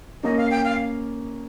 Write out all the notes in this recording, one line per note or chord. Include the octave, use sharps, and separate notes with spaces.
A#3 C#4 D#5
F5
G5
F5